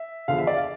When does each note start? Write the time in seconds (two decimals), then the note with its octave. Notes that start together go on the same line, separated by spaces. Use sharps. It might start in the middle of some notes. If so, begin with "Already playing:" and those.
Already playing: E5
0.28 E2 D3 F3 F5
0.38 E5
0.47 D5
0.57 F5